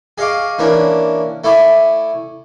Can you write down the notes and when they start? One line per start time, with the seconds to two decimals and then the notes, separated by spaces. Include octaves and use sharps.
0.18 G#4 D#5 F5 C#6 D6
0.59 E3 A#3 C#4 D4
1.44 A3 E4 D5 G#5